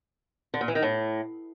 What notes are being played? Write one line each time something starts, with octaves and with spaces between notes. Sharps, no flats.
D3
A#2
E3
D#3
A2